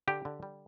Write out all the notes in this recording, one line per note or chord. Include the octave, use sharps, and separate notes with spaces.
D3 G4
D3
G3